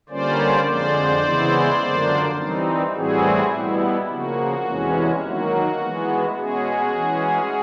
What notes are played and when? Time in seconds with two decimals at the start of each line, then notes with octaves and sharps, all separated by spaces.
0.09 D3 G3 A#3 C#4 F4 C5 D5
0.66 F2 D3 F3 G#3 C5 D5
1.23 C#3 E3 G#3 B3 E4
1.81 F#2 D3 F3 A#3 D4
2.37 E3 G3 C4 D#4
2.94 A2 E3 G3 C4 E4 F#4 G#4
3.51 B2 G3 B3 E4
4.09 C#3 F3 A#3 F#4
4.66 E2 C3 E3 G#3 C#4
5.22 D#3 F#3 A#3 F#4
5.79 E3 G#3 B3
6.36 B2 G#3 C#4 F#4 G#4
6.93 E3 G#3 C#4